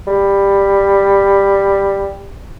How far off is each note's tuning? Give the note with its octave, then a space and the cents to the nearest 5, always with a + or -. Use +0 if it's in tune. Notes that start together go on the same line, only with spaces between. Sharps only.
G3 +10